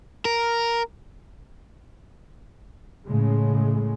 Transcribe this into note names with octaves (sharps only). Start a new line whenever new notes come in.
A#4
A2 C#3 G#3